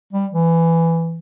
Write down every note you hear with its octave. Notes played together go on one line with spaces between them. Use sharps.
G3
E3